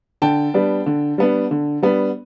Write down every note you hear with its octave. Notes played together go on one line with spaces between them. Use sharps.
D3 G5 A5
G3 B3 D4
D3
G3 B3 D4
D3
G3 B3 D4